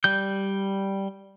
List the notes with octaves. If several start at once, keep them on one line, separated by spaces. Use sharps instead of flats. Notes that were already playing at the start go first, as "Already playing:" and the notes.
G3 G6